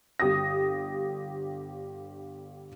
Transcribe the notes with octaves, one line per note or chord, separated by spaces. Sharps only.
G1 G4 D#6 A#6